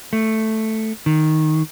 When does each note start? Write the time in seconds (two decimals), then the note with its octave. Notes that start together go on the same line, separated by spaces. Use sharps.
0.13 A3
1.06 D#3